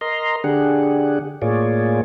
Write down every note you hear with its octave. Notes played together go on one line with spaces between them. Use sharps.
A#4 D#5 A#5 C6
D3 D4 G4 G#4 F#5
A2 A#3 F4 G#4 C#5 D5